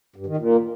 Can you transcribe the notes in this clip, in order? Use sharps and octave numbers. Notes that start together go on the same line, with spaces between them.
G2
D#3
A#2